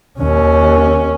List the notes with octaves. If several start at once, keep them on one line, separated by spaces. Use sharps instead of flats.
D#2 C#4